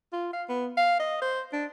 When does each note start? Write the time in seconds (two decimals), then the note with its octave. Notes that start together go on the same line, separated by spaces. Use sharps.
0.13 F4
0.33 F5
0.49 B3
0.77 F5
1.00 D#5
1.22 C5
1.53 D4